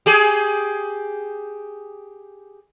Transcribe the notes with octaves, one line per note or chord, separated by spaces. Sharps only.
G4 G#4